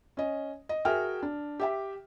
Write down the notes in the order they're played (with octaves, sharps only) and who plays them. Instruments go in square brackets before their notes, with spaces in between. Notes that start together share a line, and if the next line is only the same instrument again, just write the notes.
[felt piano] C#4 D#5
D#5
F#4 G#4 A#4 E5 G5 F6
D4
G4 E5 G5